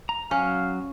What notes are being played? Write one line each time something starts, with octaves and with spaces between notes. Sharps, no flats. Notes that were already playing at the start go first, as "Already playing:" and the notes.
A#5
F#3 C#4 F5